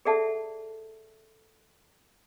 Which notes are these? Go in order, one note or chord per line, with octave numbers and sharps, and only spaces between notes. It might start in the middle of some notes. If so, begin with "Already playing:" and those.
G#4 A4 D5 E5 F#5 A5